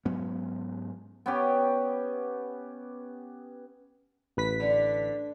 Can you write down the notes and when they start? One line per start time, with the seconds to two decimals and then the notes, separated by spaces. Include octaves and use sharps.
0.05 G#2 F#3 B3 C#4
1.26 B3 C#4 G4
4.37 A1 B4 B6
4.60 D3